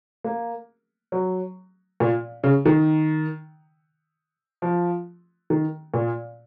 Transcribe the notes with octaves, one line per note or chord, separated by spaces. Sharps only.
A#3
F#3
A#2
C#3
D#3
F3
D#3
A#2